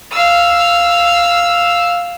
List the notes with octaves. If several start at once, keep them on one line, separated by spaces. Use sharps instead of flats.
F5 E6